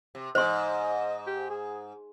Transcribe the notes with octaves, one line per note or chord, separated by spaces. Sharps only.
C3
G#2 C5 D#5 C6
G4
G#4